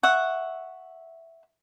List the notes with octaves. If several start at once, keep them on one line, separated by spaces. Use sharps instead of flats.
E5 F#5 C#6